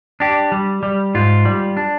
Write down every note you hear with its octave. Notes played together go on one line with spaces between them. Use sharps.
D4 G4
G3
G3
G#2 F4
G3
D4